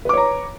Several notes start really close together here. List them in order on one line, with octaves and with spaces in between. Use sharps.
B4 D6 C#5 A#5